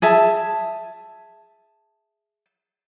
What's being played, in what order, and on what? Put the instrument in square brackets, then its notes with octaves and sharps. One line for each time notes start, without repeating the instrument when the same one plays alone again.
[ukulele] G#4 E5 A5